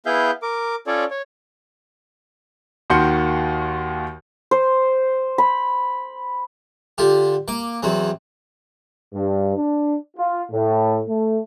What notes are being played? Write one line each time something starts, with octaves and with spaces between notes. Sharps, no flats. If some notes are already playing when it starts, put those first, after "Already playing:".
B3 E4 G#4 E5 F5 G6
A#4 D6
C#4 F4 A4 C#5 D5
C#5
D#2 D#3 F#4 C6 G6 C#7
C5
B5
D3 F4 G4
A#3 D6
E2 F#3 C4
G2
D4
F4
A2
A3